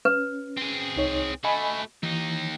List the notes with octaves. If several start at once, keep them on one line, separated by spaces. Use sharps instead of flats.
C#4 B4
C4 G#4
C2 D#4 C#5
A3 F#4 D#5 G#5 B5
D#2 E3 D#4